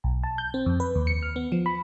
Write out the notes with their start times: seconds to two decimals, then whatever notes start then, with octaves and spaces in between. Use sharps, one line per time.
0.04 B1
0.24 A5
0.38 G6
0.54 C4
0.66 F2
0.80 B4
0.95 D#2
1.07 C#7
1.23 F6
1.36 B3
1.52 F3
1.66 B5